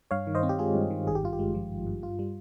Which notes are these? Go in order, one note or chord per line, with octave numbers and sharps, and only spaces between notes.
G2 C#5 F5
D#3
C5 D#5
C4
G4
G#3 F4 G#4
G2
D#3
G#1 G#4
G4
G2 F4
G4
G#3
F3
G#1
G2
G2 F4
G3